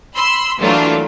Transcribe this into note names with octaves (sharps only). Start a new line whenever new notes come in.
B5 C6 E6
E3 F#3 A3 A#3 D4 F4